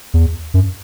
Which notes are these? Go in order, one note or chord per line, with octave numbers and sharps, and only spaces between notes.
E2
F#2